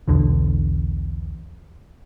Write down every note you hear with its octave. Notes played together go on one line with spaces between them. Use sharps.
B1 E2 D3